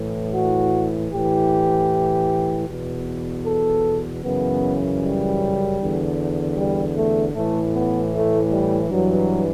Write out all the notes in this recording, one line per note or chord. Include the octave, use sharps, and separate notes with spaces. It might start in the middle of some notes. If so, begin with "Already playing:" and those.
Already playing: A2 E3
F#4
A2 E3 G4
E2 B2
A4
F#2 C#3 E3 B3
G3
E2 D3
G3
A3
A2 E3 A3
B3
A3
G3
G2 E3 F#3